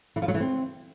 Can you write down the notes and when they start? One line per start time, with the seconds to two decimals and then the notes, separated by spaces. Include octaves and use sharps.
0.16 E3
0.22 F3
0.28 F#3
0.34 E3
0.40 C4